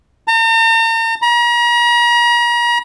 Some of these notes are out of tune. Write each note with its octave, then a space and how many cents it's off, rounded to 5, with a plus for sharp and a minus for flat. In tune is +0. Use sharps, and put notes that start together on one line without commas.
A#5 -45
A#5 +40